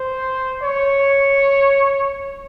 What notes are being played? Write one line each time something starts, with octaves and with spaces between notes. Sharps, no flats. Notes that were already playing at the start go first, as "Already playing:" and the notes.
Already playing: C5
C#5